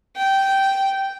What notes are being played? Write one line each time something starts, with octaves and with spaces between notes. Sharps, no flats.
G5